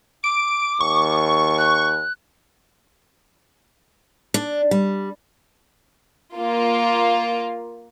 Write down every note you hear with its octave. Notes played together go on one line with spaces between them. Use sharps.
D6 D7
D#2 C#6
F#6
D4
G3
A#3 F4